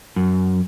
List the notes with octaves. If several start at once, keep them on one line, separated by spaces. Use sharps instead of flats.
F#2